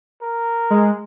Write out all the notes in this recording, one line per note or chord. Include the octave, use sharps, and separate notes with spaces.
A#4
G#3